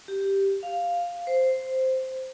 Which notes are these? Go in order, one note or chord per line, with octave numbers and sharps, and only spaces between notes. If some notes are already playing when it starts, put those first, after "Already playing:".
G4
F5
C5